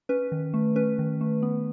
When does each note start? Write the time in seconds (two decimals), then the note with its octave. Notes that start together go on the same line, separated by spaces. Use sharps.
0.09 C#4 B4
0.32 D#3
0.54 A3
0.76 C#4 B4
0.99 D#3
1.21 A3
1.43 B3